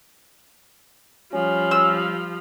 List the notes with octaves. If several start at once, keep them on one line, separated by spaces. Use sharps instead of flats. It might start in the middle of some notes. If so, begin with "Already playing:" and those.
F3 G3 C#4
E6